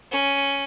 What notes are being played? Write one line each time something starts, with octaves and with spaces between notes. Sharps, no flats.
C#4